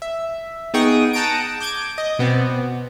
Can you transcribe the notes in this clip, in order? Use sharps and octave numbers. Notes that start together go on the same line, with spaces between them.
E5
B3 D#4 G#4 G5 C#6 D#6
F#5 G5 A5 A#5 D#6 D7
D6 G6 G#6 D7
D#5
B2 B3 C4 D5